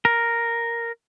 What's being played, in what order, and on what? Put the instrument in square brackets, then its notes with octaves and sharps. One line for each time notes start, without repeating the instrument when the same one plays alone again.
[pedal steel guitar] A#4